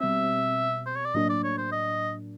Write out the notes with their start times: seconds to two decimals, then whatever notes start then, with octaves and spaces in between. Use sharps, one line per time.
0.01 B2 G3 C4 E5
0.87 C5
0.96 C#5
1.05 D5
1.14 A2 F#3 A#3 D4 D#5
1.29 D5
1.44 C#5
1.58 C5
1.72 D#5